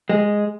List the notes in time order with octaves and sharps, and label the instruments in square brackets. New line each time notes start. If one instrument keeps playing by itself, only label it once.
[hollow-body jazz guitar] G#3